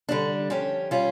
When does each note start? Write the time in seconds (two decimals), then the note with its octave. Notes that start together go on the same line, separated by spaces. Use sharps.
0.09 D3 G3 D4
0.50 F3 C#4 G4
0.91 G3 C#4 F4